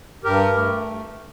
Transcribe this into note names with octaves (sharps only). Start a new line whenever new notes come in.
G2 G4 A#4
A3